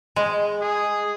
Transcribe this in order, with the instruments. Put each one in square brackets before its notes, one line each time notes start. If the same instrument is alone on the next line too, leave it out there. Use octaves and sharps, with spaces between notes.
[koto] G#3
[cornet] G#4